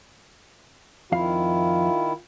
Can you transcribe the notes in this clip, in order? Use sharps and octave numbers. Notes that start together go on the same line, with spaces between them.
F2 D#3 E4 F4 F5